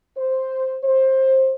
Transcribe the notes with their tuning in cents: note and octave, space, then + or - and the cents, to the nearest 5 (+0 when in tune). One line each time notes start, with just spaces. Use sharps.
C5 +0
C5 +20